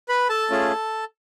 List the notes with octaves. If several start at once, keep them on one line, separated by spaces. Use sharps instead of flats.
B4 B5
A4 A5
A3 C#4 F4 G#4